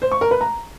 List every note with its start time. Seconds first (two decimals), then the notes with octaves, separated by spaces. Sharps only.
0.02 C5
0.12 C#6
0.21 A#4
0.31 B4
0.41 A#5